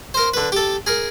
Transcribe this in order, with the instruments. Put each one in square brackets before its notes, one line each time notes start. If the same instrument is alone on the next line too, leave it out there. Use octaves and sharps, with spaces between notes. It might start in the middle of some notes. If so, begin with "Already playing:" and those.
[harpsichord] A#4 C5
D3 B4
G4 A4
G#4 A#4